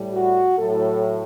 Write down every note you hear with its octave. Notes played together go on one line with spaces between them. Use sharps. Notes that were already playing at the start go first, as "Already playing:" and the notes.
Already playing: A2 G3
F#4
A2 F#3 A4